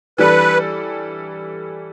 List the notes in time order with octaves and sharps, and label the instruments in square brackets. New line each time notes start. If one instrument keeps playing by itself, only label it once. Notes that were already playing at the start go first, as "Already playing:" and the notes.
[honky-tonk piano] E3 G3 D4 A4 [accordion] B4